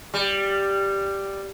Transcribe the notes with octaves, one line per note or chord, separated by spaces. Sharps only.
G3